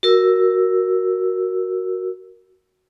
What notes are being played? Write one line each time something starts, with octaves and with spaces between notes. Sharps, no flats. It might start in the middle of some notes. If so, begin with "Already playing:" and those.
F#4 A#4 E6